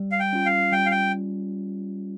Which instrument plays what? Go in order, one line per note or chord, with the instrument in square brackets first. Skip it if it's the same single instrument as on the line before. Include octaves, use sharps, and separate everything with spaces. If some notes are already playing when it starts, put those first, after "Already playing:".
Already playing: [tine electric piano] G3
[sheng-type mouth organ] F5
G5
[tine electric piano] C#4 F4
[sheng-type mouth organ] F5
[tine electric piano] G3 [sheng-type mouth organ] G5
[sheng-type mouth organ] F5
G5